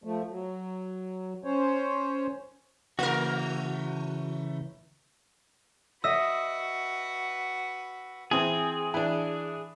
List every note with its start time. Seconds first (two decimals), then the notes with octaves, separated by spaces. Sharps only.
0.04 F3 A3
0.29 F#3
1.44 C#4 C5 C#5
2.99 C#3 E3 A3 F#4 A#4
6.04 F#4 B4 D#5 E5 E6
8.31 E3 C4 G#4 D#6
8.94 E3 D4